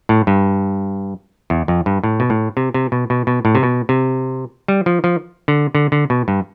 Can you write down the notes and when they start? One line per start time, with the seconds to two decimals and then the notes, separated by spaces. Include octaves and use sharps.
0.09 A2
0.27 G2
1.50 E2
1.68 F2
1.86 G2
2.04 A2
2.20 B2
2.30 A2
2.57 C3
2.74 C3
2.92 B2
3.10 B2
3.27 B2
3.45 A2
3.55 C3
3.63 B2
3.89 C3
4.68 G3
4.86 F3
5.04 F3
5.48 D3
5.75 D3
5.92 D3
6.10 B2
6.28 G2